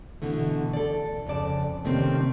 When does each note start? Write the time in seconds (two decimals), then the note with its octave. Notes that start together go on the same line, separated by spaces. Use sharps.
0.22 B2 D3 E3 A3
0.73 A4 D5
1.27 F2 C#3 D5 A5
1.85 C3 D#3 A3 A#3 C4 C#4